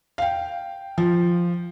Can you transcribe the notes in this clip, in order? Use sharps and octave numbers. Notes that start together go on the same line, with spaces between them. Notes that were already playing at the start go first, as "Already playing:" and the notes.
F5
G5
F3